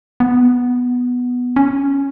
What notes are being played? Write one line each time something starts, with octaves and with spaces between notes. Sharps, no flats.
B3
C#4